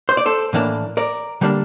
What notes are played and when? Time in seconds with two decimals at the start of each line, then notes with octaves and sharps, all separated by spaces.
0.09 C5
0.17 D5
0.26 A4 C5
0.53 A2 E3 A#3 D4
0.97 A#4 D5
1.41 D3 G3 A#3 D4